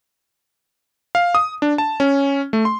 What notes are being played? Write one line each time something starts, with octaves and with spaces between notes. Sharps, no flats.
F5
D#6
D4
A5
C#4
A3
C6